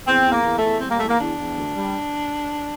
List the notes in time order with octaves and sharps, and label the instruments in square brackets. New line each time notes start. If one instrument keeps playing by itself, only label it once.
[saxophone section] E2 C4
E2
A#3
E2
A3
E2
G3 C4
A#3
E2 A3
A#3
E2 D4
E2
D2
G3